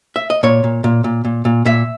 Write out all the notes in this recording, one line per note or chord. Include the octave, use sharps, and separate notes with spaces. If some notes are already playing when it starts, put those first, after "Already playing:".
E5
D#5
A#2 C#5
A#2
A#2
A#2
A#2
A#2
A#2 E5